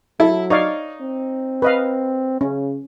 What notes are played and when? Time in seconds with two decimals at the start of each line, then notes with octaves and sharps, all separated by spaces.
0.20 F#3 E4 A4
0.50 D#4 C#5 D5 F5
1.01 C4
1.62 B4 D#5 F5
2.41 C#3 C#4